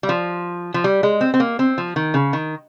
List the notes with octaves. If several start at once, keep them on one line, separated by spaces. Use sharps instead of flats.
G3
F3
F3
G3
G#3
C4
C4
A#3
C4
F3
D#3
C#3
D#3